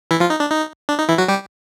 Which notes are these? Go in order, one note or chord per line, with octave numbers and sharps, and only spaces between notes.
E3 E4
F3 F4
D#4
D4
D#4
D4
D#4
E3 E4
F#3 F#4
G3 G4